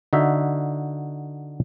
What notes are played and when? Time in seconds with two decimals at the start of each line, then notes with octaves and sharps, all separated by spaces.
0.13 D3 D#4 F#4 E5